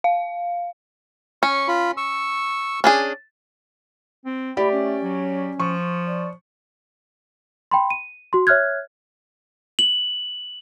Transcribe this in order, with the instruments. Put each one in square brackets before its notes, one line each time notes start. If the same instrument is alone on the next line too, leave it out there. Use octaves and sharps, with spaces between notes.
[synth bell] F5
[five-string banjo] C#4 [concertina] C#6
[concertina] F4 B5
C#6 E6
[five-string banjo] C#4 D4 G#4
[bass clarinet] C4
[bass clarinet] A3 [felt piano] G4 D5 [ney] B5
[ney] C#4
[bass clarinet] F#3
[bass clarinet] F3 [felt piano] C#6
[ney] D5
[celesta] G5 B5 C6
D#7
F#4 C6
C#5 E5 F6 F#6 G#6
[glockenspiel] F#7